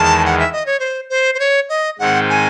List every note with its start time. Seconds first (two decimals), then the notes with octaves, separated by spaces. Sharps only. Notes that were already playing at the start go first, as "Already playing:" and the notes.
Already playing: E2 D#3 G#3 A5
0.25 F#5
0.39 E5
0.52 D#5
0.66 C#5
0.79 C5
1.10 C5
1.34 C5
1.39 C#5
1.69 D#5
1.99 G#2 D#3 G#3 C4 D#4 F#5
2.29 G#5